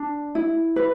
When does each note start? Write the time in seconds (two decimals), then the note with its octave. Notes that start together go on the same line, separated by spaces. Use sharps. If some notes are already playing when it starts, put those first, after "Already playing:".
Already playing: D4
0.35 E4
0.76 B4